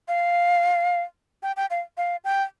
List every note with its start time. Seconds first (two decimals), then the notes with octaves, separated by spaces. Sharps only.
0.08 F5
1.43 G5
1.57 G5
1.70 F5
1.97 F5
2.24 G5